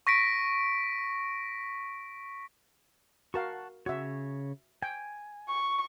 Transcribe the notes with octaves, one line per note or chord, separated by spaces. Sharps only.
C#6 A#6 B6 D7
F#4 A#4 F5 F#5 A5 C#6
C#3 F#4 C#5 E5
G5 G#5
C#6